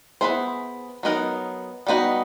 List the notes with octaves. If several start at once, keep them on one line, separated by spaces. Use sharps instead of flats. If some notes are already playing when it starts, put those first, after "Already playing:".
B3 E4 G#4 C5
F#3 B3 D#4 F#4 A#4
G3 B3 D#4 F#4